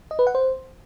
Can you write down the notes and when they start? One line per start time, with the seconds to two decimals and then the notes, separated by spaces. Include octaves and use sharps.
0.11 D#5
0.19 B4
0.27 F#5
0.35 C5